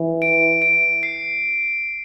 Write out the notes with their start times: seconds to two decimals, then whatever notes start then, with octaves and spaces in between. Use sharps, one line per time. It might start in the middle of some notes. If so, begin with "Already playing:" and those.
Already playing: E3
0.22 D7
0.62 D7
1.03 C7